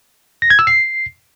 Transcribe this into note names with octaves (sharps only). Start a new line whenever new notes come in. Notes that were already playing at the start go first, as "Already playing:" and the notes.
A#6
G#6
E6
C7